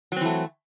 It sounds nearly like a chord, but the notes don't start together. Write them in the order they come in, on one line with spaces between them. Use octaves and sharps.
F#3 C4 E3 A3